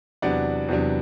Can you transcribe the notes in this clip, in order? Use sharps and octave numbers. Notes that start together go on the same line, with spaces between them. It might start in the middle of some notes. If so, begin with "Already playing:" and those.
E2 C3 F#3 B3 D4 D5 F#5
E2 C3 F#3 B3 D4